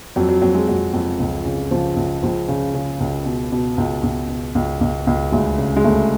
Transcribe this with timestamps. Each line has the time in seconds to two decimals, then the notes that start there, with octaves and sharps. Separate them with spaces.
0.16 F2 F#3
0.29 F#3
0.42 F2 F#3
0.55 G#3
0.68 F2 F#3
0.93 F2
1.19 C#2
1.45 C#3
1.71 C#2 F3
1.96 C#2
2.23 C#2 F3
2.48 C#3
2.74 C#3
3.00 C#2
3.25 B2
3.52 B2
3.78 C#2
4.03 C#2
4.29 B2
4.55 C#2
4.81 C#2
5.07 C#2
5.32 D2 G#3
5.58 C#3
5.76 G#3
5.84 D2 A3